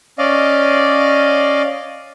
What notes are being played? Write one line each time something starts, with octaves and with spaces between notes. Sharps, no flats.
C#4 D5 D#5 F5